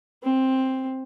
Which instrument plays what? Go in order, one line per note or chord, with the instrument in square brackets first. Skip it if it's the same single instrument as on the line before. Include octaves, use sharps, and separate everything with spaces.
[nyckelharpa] C4